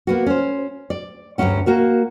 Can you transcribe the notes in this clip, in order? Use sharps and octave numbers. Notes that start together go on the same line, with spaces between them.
A#3 B3 F#4
C#4 C5
D5
D2 G2 E3 F#3 C#4 F#5
A#3 F#4 A#4